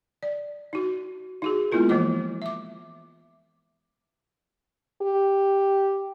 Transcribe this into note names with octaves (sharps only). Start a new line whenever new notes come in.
D5
D#4 F#4
D#4 F#4 G#4
G#3 A#3 B3 E4 F4 A#4
E3 F3 A#3 D#5 D6
E5 D6
G4